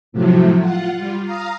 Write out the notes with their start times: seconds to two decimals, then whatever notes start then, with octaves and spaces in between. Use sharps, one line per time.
0.12 A2 C3 F3 F#3 A3
0.59 F4 F#5
0.94 G3 F4
1.24 F5 A#5 D#6